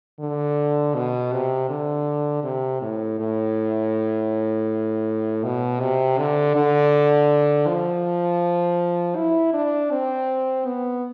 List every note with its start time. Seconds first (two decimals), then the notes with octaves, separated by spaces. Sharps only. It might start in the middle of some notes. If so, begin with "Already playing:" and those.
0.20 D3
0.94 B2
1.32 C3
1.69 D3
2.44 C3
2.82 A2
3.20 A2
5.44 B2
5.80 C3
6.18 D3
6.55 D3
7.67 F3
9.16 E4
9.54 D4
9.91 C4
10.66 B3